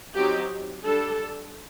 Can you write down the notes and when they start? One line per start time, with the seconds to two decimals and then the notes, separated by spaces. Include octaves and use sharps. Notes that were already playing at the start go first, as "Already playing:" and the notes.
0.15 F#3 C4 D#4 G4
0.86 G3 D4 A4